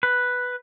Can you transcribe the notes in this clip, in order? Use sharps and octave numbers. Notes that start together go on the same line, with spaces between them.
B4